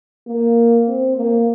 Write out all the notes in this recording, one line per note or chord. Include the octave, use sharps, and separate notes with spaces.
A#3
C4
A#3